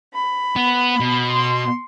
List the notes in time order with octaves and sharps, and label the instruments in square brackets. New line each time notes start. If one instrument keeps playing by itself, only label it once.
[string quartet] B5
[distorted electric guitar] B3
B2
[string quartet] C6